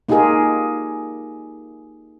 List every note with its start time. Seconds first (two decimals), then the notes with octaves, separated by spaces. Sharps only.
0.09 A#3 D#4 F4 G4 G#4 A#4